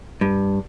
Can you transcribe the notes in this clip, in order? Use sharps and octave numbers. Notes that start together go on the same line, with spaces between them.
G2